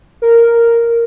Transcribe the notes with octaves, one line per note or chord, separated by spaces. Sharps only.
A#4